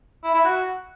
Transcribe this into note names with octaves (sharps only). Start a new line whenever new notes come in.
E4
E4
F#4